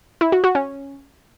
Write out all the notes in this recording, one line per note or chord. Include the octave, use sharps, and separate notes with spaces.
E4
F#4
F#4
C#4